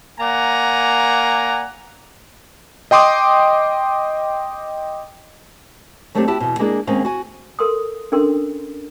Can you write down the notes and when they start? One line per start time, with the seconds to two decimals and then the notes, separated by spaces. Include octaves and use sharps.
0.20 A#3 D5 F#5 G#5 A#5
2.91 D#5 G5 C6 D6 D#6
6.15 F#3 A3 A#3 C4 D4 G4
6.28 E4 F#4 G4 A5
6.40 E2 B2
6.59 G#3 A#3 B3 D4 G#4
6.87 D#2 G#3 A#3 C4 C#4 F5
7.05 F#4 G#5
7.59 A4 A#4 C6 D#6
8.12 C#4 D4 A4 A#4 C6